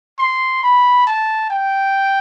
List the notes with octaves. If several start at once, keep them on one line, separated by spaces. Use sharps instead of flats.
C6
B5
A5
G5